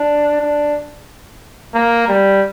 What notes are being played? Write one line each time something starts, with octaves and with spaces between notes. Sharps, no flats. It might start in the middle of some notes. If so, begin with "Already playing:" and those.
Already playing: D4
D4
A#3
G3